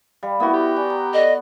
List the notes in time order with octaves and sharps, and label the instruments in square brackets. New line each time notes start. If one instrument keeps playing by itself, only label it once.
[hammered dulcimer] G3 [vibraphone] F5
[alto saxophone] A#3 [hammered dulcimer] B3 F#4 [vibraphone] E4 E5
[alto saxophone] G4
[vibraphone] D5 G#5 B5
A#5
[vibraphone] A4 D5 [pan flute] D#5